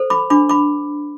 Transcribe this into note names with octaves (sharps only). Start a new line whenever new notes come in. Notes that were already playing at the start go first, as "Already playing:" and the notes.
Already playing: A4 C5
B5 D6
D4 B5 D6
B5 D6